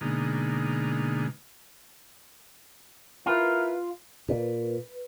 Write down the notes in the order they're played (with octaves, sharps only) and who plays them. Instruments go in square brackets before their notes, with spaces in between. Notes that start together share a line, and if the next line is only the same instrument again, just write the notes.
[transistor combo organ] B2 D3 G#3 A#3 D#4
[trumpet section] E4 A#4 B4 [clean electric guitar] F4
[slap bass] A#2 [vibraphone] B4